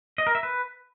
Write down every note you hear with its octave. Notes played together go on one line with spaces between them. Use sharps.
D#5
A#4
E5
B4